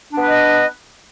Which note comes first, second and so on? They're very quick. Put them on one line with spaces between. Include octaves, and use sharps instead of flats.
D4 B3 B4 D#5